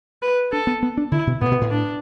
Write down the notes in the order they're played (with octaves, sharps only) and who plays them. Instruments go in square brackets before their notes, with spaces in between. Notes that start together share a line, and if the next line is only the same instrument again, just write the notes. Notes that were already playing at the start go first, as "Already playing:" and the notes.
[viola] B4
[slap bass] D4 [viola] A4
[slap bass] B3
B3
D4
[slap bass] D3 [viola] E4
[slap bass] B2
[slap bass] A2 [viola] B3
[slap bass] B2
A2
[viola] D4